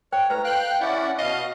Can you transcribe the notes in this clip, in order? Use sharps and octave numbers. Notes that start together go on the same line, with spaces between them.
C5 C#5 G5
A2 B4 C5 A#5
F5 G5 F#6
C#4 E4 D5 F#5
B2 D#5 F5